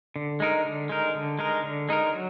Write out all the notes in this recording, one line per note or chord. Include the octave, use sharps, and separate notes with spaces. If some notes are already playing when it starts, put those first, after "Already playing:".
D3
G#3 D#4 A#4
D3
G#3 D#4 A#4
D3
G#3 D#4 A#4
D3
G#3 D#4 A#4
F#3